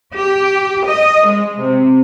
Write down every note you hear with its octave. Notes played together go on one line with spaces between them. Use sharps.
G4
D#5
G#3
C3